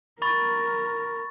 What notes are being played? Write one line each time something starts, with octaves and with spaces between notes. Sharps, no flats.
A#4 B5 C#6 A6